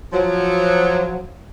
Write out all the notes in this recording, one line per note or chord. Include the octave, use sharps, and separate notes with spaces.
F3 F#3